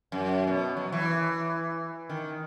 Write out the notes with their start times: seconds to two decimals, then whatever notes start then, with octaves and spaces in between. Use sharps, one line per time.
0.12 F#2
0.47 B2
0.77 F#3
0.92 E3
2.09 D#3